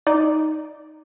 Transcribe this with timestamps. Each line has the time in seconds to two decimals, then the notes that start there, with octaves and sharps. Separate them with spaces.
0.07 D#4 D5